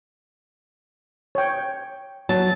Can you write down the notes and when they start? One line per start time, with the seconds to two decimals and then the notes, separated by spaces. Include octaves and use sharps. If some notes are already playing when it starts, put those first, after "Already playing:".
1.35 C#5 G5
2.29 F#3 A5